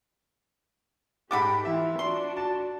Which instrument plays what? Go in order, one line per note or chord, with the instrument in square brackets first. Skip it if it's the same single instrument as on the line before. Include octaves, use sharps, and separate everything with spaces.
[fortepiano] G#2 F#5 D6 [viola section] G4 [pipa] A4 G5 B5
[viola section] E3 F4 [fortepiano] E5
[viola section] D4 F#4 [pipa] C6
[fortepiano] A5